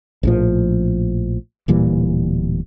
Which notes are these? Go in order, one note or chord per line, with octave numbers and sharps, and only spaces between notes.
A#1 A2 F3
D1 A#2 E3 G3